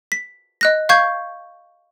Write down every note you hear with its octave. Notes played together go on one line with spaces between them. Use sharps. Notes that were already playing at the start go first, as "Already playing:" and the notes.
B6
D#5 F#6 A#6
F5 C#6 G6 G#6